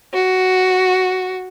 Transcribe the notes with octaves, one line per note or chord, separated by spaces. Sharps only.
F#4